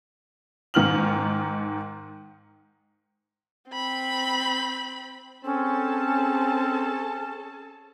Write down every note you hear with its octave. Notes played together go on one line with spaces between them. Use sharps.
G#2 D#3 F6 F#7
C4 B5
C4 C#4 G#4 A4 A5